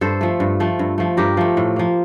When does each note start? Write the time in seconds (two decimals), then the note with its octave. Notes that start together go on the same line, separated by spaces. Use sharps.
0.01 G2 A4 C5
0.21 F3 A3
0.40 G2
0.60 F3 A3
0.79 G2
0.98 F3 A3
1.17 G2 G4 A#4
1.37 F3 A3
1.57 A2
1.76 F3 A#3